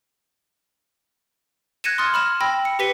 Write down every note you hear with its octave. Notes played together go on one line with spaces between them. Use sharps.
F#6 G#6 A#6 C#7 D#7 E7
C6 D#6 F6 A6
B5 F6 E7
G5 B5 E6 A#6
C#7
G4 B4 B6 C#7 D#7 G7